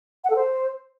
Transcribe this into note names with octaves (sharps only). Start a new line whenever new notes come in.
F#5
A4
C5